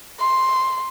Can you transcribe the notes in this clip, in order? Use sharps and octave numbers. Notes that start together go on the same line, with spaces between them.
C6